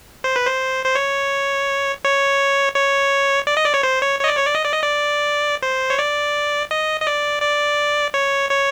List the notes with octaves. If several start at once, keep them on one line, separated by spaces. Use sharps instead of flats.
C5
B4
C5
C5
C#5
C#5
C#5
D5
D#5
D5
C#5
C5
C#5
C#5
D#5
D5
C#5
D5
D#5
D5
D#5
D5
C5
C#5
D5
D#5
D#5
D5
D5
C#5
C#5